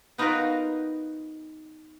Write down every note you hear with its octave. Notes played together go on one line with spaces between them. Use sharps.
B3 D#4 F4 F#4 A#4 B4